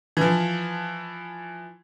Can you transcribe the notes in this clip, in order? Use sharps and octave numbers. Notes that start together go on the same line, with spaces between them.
E3 F3